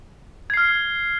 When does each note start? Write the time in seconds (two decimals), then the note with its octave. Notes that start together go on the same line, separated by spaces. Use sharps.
0.50 G#6
0.54 C7
0.57 F6